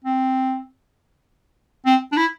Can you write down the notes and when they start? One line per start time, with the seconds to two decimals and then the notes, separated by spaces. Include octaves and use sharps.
0.04 C4
1.86 C4
2.12 D4
2.17 E4